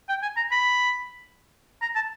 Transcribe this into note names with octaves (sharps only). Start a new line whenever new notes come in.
G5
G#5
A#5
B5
A#5
A5